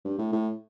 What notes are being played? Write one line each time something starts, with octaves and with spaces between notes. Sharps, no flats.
G2
A2
A2